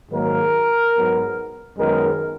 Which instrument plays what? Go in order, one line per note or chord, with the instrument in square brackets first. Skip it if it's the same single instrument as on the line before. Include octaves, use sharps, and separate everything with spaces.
[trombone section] G#2 D#3 F#3 A#3 A#4
G#2 F#3 B3
F#2 D#3 G#3 B3 A#4